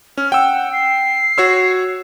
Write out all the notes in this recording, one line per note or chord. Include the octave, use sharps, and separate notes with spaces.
C#4 F6
F#5 G5 E6
C7
F#4 C#5 E6